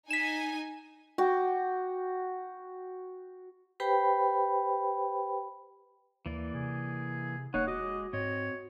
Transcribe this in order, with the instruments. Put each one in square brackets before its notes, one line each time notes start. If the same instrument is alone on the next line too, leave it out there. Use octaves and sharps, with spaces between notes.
[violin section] D#4 G#5 [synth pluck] B6 E7
[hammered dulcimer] F#4 G5 D6
[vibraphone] G4 B4 C5 G5 B5
[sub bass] D#2 [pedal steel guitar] E3 A#3 D5
[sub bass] C3 [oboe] G#4
[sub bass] E1 [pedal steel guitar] A#3 D#4 [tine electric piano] C#5 [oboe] F#5
[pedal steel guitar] G#3 D6 [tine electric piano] F#4 [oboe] D#5
[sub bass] G#2 [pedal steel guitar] C4 D#5 [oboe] C#5